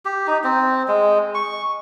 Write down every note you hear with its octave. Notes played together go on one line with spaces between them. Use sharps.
G4
D#4
C4
G#3
C#6